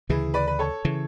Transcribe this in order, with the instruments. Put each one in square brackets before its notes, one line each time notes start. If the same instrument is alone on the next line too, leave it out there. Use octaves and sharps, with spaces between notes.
[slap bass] D2 C#3 E3 [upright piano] E4 G#4
[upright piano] B4 D5
B4
A4 C#5
[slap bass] C#3 E3